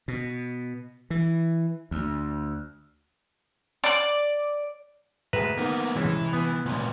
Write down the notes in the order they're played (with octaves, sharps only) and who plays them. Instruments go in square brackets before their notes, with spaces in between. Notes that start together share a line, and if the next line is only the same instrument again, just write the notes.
[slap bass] B2
E3
D2
[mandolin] D5 D6
[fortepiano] D2 G#3 A3 [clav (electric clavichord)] B4 E5 A#5
[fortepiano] D#3 [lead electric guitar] A#3 B3
[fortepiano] C2 G#3 C#4 [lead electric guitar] E3
[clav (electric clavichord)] B3
[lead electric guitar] C#2 A#2